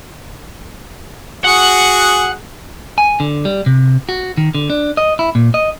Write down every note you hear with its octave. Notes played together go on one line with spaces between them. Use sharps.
F#4 G#4 F#5
G#5
D3
G3
C3
F#4
D#3
D3
D4
D#5
E4
A#2
D#5